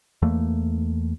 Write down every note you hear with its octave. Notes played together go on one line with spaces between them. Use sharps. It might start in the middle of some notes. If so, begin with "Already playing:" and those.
E2 E3 A3 A#3